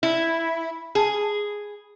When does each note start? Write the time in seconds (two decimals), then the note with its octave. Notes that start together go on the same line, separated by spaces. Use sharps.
0.03 E4
0.95 G#4